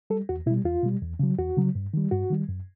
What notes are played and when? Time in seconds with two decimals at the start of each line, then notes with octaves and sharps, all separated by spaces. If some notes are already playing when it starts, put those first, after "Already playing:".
0.10 G3 A4
0.29 E2 F#4
0.46 B2 E4
0.51 G3
0.65 E2 F4
0.83 B2 G3
1.02 E2
1.19 C#3 F#3
1.39 E2 F#4
1.57 C#3 F#3
1.75 G2
1.94 D#3 G3
2.11 G2 F#4
2.30 D#3 G3
2.49 F#2